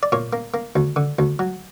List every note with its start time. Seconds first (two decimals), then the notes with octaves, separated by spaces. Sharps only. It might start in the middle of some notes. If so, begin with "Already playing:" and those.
0.03 D5
0.12 A#2 C#5
0.33 A#3
0.54 A#3
0.76 D2
0.96 D3
1.19 D2
1.39 F#3